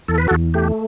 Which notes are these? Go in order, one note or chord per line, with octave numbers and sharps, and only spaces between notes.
E2 A4
B4
F#4 A4
E2
A3 G4